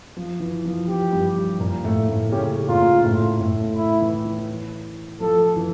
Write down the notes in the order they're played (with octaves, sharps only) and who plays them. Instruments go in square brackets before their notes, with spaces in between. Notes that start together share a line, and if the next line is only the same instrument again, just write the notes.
[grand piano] F3
E3
F3
[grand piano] F3 [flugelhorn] G4
[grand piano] G2 G3
A#2 A#3
A2 A3
A2 A3
[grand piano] C#3 C#4 [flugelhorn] G4
[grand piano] A#2 A#3 [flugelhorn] F4
[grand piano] A2 A3
A2 A3
[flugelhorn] E4
[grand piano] E3
E3
[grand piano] F3 [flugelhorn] A4
[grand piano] E3